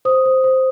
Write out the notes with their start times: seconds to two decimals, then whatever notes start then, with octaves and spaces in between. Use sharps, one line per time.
0.05 C5 D#6
0.26 C5
0.44 C5